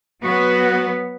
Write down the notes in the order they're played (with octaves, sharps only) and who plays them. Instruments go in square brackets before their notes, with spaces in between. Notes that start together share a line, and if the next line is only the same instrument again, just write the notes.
[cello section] F#3 B3 [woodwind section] F#4